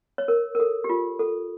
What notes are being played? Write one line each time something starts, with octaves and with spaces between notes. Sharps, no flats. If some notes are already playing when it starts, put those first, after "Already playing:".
C#5
A#4
A#4
A4
G4
F4
A4